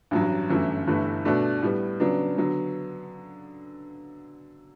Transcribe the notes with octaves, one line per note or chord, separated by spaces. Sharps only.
A1 G2 F#3
G1 F#2 E3 A3 E4
G1 G2 E3 A3 E4
B2 A3 D4
A2 G3 B3
C#3 F#3 B3 D4
D3 F#3 B3